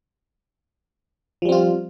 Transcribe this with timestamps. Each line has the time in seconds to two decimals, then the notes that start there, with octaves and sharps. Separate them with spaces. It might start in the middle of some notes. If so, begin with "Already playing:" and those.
1.42 F3
1.45 G3
1.49 C4
1.52 F4